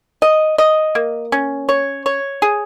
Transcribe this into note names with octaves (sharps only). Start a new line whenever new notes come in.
D#5
D#5
A#3
C#4
C#5
C#5
G#4